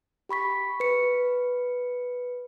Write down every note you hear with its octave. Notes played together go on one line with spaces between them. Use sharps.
G4 B5 C#6 B6
B4 C#7